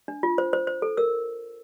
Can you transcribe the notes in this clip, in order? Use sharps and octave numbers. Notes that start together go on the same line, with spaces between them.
D4
F4
C5
C5
C5
A4
A#4 E6